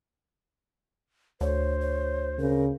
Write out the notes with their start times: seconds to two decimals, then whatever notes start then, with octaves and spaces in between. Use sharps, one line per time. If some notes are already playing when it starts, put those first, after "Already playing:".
1.41 D2 C5 C#5
1.81 C#5
2.39 C#3 A#4